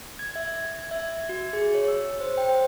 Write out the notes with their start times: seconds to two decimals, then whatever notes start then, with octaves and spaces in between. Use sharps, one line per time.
0.19 G#6
0.36 E5
0.79 G#6
0.91 E5
1.09 G#6
1.29 F#4
1.53 G#4
1.74 C#5
1.88 E6
2.20 C5
2.38 G5
2.49 C5